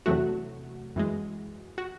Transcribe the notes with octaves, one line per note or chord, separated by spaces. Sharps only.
E2 C3 F#3 A3 F#4
F#2 E3 G#3
F#4